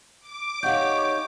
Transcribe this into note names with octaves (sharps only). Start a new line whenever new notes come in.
D6
D#4 G4 C#5 F5 F#5 G6